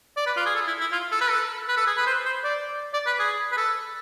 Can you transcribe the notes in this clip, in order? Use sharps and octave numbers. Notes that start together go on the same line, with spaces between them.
D5
B4
F4
G#4
A4
E4
E4
F4
A4
B4
A4
B4
A4
G#4
B4
C5
C5
D5
D5
B4
G#4
B4
A4